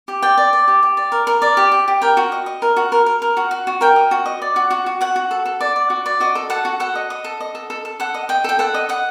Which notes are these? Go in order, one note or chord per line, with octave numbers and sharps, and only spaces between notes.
G4
D5 G5
D5
D5
G4
G4
D5
A#4
A#4
D5
G4
G4
G4
A#4 G5
F#4
D#5
D#5
A#4
F#4
A#4
A#4
A#4
F#4
F#4
F#4
A#4 G5
D#5
F#4
D#5
D5
F#4
F#4
F#4
F#4 F#5
F#4
A4
A4
D5
D5
F#4
D5
F#4 D#5
A4
A4 F#5
F#4
A4 F#5
D#5
D#5
A4
D#5
A4
A4
A4
A4 F#5
D#5
D#5 G5
A4 G5
A4 F#5
D#5
D#5 F#5